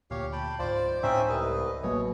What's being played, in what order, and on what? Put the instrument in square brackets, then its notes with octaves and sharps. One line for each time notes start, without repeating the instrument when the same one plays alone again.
[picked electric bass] D2 A#2 [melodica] G4 C#5 F5
[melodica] G5 A5 B5
[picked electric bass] C#2 G#2 [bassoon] F3 [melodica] C5 D5
[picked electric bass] C#2 A2 [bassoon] C4 [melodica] C#4 D#4 E5
[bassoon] C2 [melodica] B4 D#5
[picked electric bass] A1 F#3 A#3 [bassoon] B2 [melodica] G#4 C#5